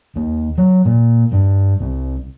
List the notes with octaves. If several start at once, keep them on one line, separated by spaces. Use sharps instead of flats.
D#2
F#3
A#2
G2
C2